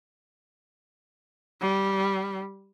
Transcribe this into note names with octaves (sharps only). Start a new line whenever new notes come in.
G3